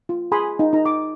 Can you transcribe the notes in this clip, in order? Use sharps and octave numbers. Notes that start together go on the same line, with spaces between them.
F4
G#4 G#5 B5 C6 D#6
D#4
D#4 A#5
D6